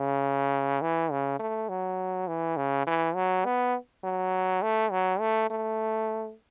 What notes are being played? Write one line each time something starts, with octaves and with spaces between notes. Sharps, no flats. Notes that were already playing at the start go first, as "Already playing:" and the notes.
Already playing: C#3
E3
C#3
A3
F#3
E3
C#3
E3
F#3
B3
F#3
A3
F#3
A3
A3